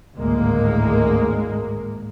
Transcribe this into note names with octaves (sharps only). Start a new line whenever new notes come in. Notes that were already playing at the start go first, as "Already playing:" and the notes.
G#1 D2 A2 G#3 A#3